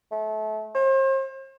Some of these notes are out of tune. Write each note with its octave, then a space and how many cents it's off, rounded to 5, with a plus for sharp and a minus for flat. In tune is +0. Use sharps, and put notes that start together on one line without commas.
A3 -30
C5 +40